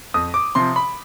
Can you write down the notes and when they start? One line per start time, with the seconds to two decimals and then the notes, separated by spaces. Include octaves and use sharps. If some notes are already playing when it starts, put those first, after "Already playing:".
0.14 F2 D#6
0.34 D6
0.55 C3 F3 C6
0.76 B5